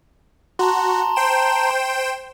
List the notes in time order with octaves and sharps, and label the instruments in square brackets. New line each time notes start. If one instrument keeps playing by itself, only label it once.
[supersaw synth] F#4 [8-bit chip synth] A5 A#5 C6
[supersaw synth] C5 G5 E7